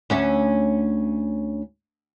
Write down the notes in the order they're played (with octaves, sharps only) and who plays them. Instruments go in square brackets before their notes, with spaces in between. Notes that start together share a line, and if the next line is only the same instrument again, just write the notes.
[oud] D2 C#4 E5